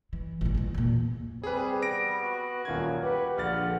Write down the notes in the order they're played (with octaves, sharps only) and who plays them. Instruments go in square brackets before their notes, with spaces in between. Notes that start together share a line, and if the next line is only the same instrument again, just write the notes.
[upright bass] E3
A1 B2
E2 F3
E2 A#2
[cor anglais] G3 [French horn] C4 [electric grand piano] G#4 B4
[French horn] B3 [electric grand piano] A#6 D7
[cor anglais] F#4
[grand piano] D#1 F4 G#6 [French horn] F#2
[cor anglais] G4 [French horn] B4 [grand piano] F#5
[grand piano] A#1 F#5 A6 [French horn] D3 [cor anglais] F5